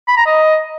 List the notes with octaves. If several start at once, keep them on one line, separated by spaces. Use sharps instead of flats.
B5
A#5
D#5